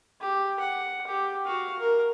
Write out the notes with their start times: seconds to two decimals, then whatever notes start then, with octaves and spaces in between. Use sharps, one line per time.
0.21 G4
0.60 F#5
1.07 G4
1.46 F#4 F5
1.79 A#4